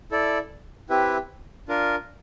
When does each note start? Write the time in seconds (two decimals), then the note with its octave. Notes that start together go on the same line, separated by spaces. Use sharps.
0.11 E4 A4 D5
0.89 C4 E4 G4 B4 E5
1.68 D4 F4 A#4